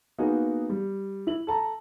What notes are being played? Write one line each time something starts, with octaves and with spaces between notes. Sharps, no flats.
A#3 B3 D#4 F#4 G#4
G3
E4 F#7
A4 A5 A#5